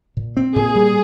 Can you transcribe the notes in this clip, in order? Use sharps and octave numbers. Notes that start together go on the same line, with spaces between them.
A#2
C4
A#2 G#4
G3